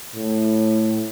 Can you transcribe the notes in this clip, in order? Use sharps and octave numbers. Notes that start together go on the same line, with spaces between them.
A2